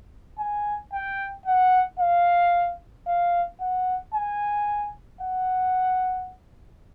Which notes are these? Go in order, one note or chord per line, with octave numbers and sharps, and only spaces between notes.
G#5
G5
F#5
F5
F5
F#5
G#5
F#5